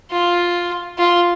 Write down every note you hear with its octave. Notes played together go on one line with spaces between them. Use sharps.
F4
F4